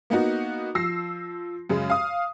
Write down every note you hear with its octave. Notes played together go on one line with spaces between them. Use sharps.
A#3 B3 D#4 F#4
F3 E6 A#6 C7
F#2 C#3 G#3
F5 D#6